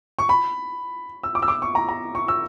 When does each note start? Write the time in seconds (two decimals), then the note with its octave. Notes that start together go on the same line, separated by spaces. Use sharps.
0.19 C#6
0.29 B5
1.23 E6
1.35 D6
1.42 E6
1.48 D6
1.62 C#6
1.75 A#5
1.89 A#5
2.15 C#6
2.28 E6